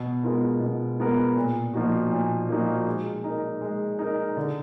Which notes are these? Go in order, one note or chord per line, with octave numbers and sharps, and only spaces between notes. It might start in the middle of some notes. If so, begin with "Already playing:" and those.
Already playing: B2
G#3 B3 F4 A#4
B2
G#3 B3 F4 A#4
A#2
F3 A#3 D#4 F#4
A#2
F3 A#3 D#4 F#4
G#3
D#4 A#4
G#3
D#4 A#4
D3